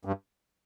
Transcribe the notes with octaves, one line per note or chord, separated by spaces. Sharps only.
G2